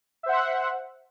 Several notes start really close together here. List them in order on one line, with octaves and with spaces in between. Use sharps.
E5 C5 F#5